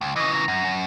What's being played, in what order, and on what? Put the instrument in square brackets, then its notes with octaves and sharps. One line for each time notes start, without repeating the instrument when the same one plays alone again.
[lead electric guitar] C#2
[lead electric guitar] C#3 E3 [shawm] D#5
[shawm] A#5
[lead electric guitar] F#2
F#2